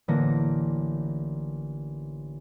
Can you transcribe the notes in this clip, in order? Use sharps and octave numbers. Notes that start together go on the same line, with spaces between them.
A1 D3 A#3 A#6